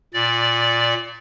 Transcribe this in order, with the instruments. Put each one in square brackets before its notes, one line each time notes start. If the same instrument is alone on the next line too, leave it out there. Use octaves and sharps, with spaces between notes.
[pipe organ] A#2 D5